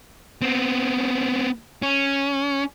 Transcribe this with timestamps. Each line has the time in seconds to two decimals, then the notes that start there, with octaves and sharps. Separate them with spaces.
0.41 B3 C4
1.82 C#4